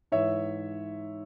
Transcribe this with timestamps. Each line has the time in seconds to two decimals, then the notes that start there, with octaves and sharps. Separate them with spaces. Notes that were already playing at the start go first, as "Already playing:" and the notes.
0.12 G#2 E3 C#5 E5